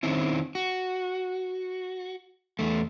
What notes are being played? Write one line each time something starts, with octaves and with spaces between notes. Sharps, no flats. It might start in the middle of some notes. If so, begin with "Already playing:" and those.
D#3 C4 C#4 E4
F#4
E2 A3